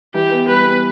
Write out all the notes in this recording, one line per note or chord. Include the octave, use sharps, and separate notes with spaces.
E3 G4
B3
G3 B4
B3